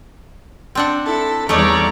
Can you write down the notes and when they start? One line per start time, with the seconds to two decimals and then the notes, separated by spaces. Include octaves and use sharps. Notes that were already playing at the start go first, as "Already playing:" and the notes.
0.75 C4 D4 F#5
1.05 E4 A4
1.49 E2 G3 A3 C#4 D#4 C#5 D5 A#5